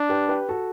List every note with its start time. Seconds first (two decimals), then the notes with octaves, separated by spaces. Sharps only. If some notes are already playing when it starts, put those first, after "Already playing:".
Already playing: D4
0.09 G4 B4
0.29 G4 B4
0.49 F#4 A4